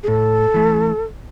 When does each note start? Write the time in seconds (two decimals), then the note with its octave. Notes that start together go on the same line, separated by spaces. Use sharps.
0.03 G#4
0.08 A2 A4
0.54 E3 A3